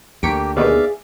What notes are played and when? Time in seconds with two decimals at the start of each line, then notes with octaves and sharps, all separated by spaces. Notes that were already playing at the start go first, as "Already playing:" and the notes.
0.23 D2 A#3 G4 C#6 B6 D7
0.56 D#2 B2 D#3 G#4 D5 E5 F5